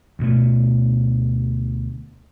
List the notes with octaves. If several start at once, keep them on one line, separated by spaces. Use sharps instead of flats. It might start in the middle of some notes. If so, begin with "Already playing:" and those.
D2 B2 A3